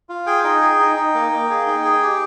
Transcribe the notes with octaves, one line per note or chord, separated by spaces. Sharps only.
F4
G#4 G5
D#4 G5
G#4
D#4
D#4
A#3
A#3
G#4
D#4
G#4
G4